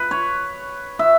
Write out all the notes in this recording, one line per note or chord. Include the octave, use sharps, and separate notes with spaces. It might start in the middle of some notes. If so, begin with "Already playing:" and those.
Already playing: B4
C#5
E5